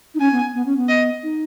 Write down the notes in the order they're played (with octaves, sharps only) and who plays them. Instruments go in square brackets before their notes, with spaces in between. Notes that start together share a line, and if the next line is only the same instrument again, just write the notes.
[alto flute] D#4
[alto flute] C#4 [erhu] G#5
[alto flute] B3
B3
C#4
B3
[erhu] D#5
[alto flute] D#4